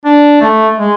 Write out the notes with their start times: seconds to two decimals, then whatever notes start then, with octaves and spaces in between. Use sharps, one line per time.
0.05 D4
0.41 A3
0.78 G#3